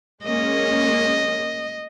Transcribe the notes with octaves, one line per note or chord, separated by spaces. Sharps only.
G#3 A#3 C#4 D#5